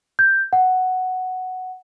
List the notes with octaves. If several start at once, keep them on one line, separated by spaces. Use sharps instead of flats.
G6
F#5